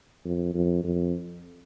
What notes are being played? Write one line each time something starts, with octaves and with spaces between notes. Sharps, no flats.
F2
F2
F2